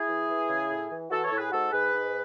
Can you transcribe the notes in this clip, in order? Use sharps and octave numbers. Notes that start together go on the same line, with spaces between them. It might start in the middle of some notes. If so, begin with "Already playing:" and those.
Already playing: E4 G#4
E3
E3
C#3
A2
E3
E3 F#4 A4
A4 C#5
A2
G#4 B4
G#2 F#4 A4
G#2 G#4 B4
G#2